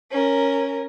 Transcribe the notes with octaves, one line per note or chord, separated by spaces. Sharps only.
C#4 A#4